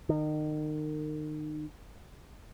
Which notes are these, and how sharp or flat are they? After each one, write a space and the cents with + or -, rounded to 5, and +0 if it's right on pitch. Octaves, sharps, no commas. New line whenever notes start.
D#3 -30